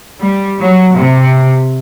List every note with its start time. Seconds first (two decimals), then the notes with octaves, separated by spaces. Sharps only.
0.21 G3
0.59 F#3
0.95 C3